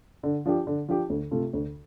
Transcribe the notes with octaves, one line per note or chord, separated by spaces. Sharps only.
D3
F3 D4 G4
D3
F3 D4 G4
D2
C3 A3 F4 A4
D2